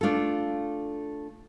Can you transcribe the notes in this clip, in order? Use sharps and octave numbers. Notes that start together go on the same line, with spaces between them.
A3 D4 F4 A4